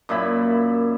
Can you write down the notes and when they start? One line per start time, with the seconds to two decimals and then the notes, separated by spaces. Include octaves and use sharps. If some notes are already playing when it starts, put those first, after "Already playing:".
0.09 F#2 A#2 E4 B5